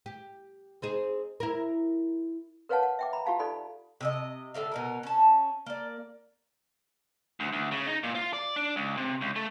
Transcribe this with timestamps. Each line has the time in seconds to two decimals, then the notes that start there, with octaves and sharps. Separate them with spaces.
0.06 G4
0.82 C4 D#4 G#4
1.40 E4 A#4
2.69 A#4 B4 C#5 F5 F#5 A5
2.83 F#5
2.99 E5 G5 D6
3.13 A#5 B5
3.26 F4 G4 F5 A5
3.39 D#4 A4 D5 B5
4.01 C3 G#4 D#5
4.54 A2 D3 E5 F5
4.72 B2 D#4 A#4
5.03 C#4 A5
5.66 A#3 D5
7.40 D2
7.53 D2
7.72 C#3
7.87 D#4
8.03 A#2
8.15 F4
8.33 D5
8.56 D4
8.76 C#2
8.97 C3
9.21 C#2
9.36 A3